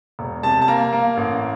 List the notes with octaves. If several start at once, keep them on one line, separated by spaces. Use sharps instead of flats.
E1
C3 A5
A5
A#3 A#5
A#3
A1